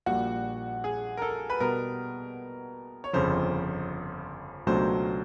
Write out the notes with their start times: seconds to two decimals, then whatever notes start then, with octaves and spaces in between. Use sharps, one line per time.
0.06 A#1 A#2 G3 F#4
0.84 G#4
1.17 A#4
1.22 A4
1.50 B4
1.60 B2 G3 B3 A#4
3.04 C#5
3.13 G1 F2 C#3 F3 C5
4.67 C#2 B2 F#3 A3 D4 C5